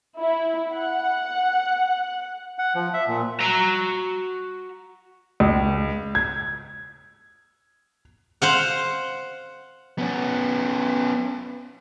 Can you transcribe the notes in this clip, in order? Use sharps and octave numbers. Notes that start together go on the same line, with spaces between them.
E4
F#5
F#5
F3
E5
A#2
F#4 A#5
C#2
G#6
C5 F5 F#5
B3 C#4